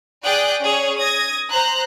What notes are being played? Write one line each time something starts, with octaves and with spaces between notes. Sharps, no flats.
G#4 D5 G5 D#6 F#6
C#4 G#4 C#5
D#6 G#6 A#6
C5 A#5 F#6